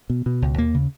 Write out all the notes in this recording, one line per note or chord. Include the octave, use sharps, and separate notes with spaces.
B2
B2
C#2
D#2 A#3
C#3